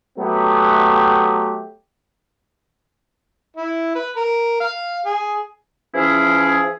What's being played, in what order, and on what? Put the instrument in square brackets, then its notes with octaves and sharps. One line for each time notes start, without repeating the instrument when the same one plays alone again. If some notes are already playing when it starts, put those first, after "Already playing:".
[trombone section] F#3 A3 B3 G4
[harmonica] E4
B4
A#4
F5
G#4
[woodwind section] E3 F3 C#4 E4 G#4